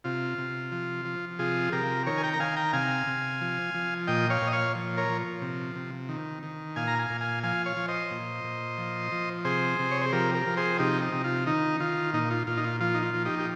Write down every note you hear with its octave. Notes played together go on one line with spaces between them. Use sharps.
C3 F4
C3
F3
F3
C3 F4 G#4
C3 G4 A#4
D#3 A#4 C#5
G#5
G5 A#5
A#5
D#3 F5 G#5
G5 A#5
C3 F5 G#5
C3
F3
F3
A#2 D#5 G5
C#5 F5
A#2
D#5
C#5 F5
F3
A#4 C#5
F3
C3
C3
D#3
D#3
A#2 F5 G#5
A#5
F5 G#5
A#2
F5 G#5
F3 F5 G#5
C#5 F5
F3
C5 D#5
A#2
A#2
F3
F3
C3 G#4 C5
C3
C#5
C5
F3 G4 A#4
G4 A#4
F3
G#4 C5
C3 D#4 G4
D#4
C3
F4
D#3 D#4
D#3 F4
A#2 D#4
F4
A#2 F4
D#4
F4
F3 F4
D#4
F4
F3
D#4 G4
G4